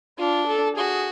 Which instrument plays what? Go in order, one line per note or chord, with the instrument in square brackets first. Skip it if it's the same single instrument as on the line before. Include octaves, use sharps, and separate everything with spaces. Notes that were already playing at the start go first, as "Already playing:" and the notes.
[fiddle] D4 [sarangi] F4
[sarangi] A4
[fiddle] F#4 [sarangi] G#4